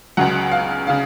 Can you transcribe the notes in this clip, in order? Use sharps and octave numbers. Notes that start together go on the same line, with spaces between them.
C#2 C#3 F#3 F#5
F5
C#3 F5